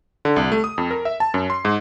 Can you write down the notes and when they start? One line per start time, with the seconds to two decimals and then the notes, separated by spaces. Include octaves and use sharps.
0.25 D3
0.36 C2
0.52 A3
0.64 D#6
0.78 F2
0.91 A#4
1.05 E5
1.20 A5
1.34 F#2
1.50 C6
1.65 G#2